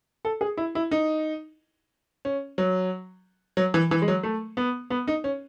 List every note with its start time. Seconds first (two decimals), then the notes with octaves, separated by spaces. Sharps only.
0.25 A4
0.41 G#4
0.57 E4
0.75 E4
0.91 D#4
2.25 C#4
2.58 F#3
3.57 F#3
3.74 E3
3.91 E3
4.02 G#3
4.08 F#3
4.23 A3
4.57 B3
4.90 B3
5.08 D#4
5.24 C#4